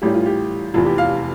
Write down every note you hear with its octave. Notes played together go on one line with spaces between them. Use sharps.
A1 A2 E3 G3 G4
F4
G4
F1 E2 E3 F4
G4
F5